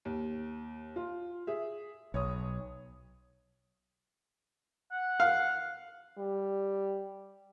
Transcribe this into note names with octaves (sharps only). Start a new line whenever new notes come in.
D#2
F4
G#4 E5
B1 C#5 D#6
F#5
F5
G3